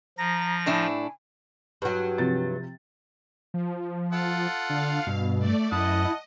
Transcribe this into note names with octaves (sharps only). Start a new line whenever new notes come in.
F3 A#5 A#6
A2 D4 E4 G#5
G2 F#3
C3 F3 A6
F3
F4 A4 F#5
D3 F5
G2 B2
A3 D5
F#2 E4 D#5 F#5 A5 D#6